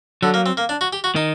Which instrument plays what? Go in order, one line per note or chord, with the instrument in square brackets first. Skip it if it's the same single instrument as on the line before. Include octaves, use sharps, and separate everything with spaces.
[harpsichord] D3 [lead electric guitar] F#3
[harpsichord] A#3
C4
A#3
D4
F#4
G4
F#4
[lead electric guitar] D#3 [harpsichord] D#4